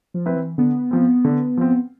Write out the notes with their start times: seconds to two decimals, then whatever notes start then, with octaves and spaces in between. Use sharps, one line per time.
0.14 F3
0.26 C4 E4 B4
0.36 E3
0.58 D3 B3
0.91 F3 C4
1.25 D3
1.57 F3 C4